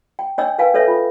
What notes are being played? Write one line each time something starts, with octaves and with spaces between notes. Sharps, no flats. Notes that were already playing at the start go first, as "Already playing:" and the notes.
G5
D4 C#5 D#5 G5 E6
A#4 B4 F5 G5 G#5
D4 A4 B4 C#5 E5
F4